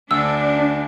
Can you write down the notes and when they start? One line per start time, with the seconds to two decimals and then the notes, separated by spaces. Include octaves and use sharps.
0.11 D2 D4 E6